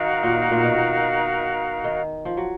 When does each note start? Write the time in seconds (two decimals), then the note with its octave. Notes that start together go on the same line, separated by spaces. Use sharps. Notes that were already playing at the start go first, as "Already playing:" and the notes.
Already playing: D#3 D#4 F#4 A#4 F5
0.23 A#2
0.51 A#2
0.64 B2
1.84 D#3
2.25 F3
2.37 F#3